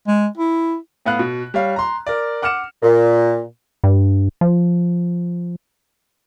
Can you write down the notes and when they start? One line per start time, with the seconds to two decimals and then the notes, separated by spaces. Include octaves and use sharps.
0.08 G#3
0.37 E4
1.05 A2 B3 F5 F#6
1.19 B2
1.54 G3 C#5 F5
1.76 A#5 C6
2.07 A#4 D5
2.42 F#5 D6 F6 C#7 E7
2.83 A#2
3.84 G2
4.41 F3